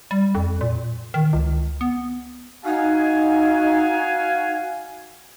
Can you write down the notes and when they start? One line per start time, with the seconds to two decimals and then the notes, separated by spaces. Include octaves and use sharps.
0.11 G3
0.35 F2
0.61 A#2
1.14 D#3
1.33 C#2
1.81 B3
2.65 D#4 F#4 F5 G#5